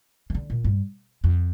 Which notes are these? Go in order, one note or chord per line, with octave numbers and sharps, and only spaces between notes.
D#3
D3
A#2
G2
F2